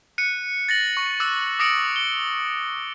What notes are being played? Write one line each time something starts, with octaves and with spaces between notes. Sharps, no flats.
F#6 C#7 D#7
A6 A#6 F#7
C#6
D6 E6 F#6 A6
D6 D#6 A#6 C#7 D7 F#7
G7